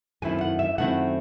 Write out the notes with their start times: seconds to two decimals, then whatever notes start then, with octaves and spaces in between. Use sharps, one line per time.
0.22 F#2 D#3 A3 C4 E4 G#5
0.41 F#5
0.59 E5
0.78 F#2 D#3 A3 C4 E4 F#5